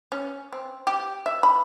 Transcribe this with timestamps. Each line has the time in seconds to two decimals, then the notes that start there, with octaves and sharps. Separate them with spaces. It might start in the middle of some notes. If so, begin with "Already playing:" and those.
0.12 C#4
0.52 C4
0.87 G4
1.26 E5
1.43 B5